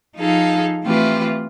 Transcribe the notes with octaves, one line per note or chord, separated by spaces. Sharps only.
F3 D#4 G#4 A4 F5
E3 A3 C4 F4 G4 B4